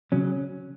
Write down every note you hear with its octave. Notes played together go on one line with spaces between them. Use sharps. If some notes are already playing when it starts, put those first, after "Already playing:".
C#3 F#3 C#4